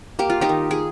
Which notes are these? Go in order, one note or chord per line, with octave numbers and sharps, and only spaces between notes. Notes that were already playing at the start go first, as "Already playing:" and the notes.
A#3 G4
F4
D#4 G4
D#3
G#4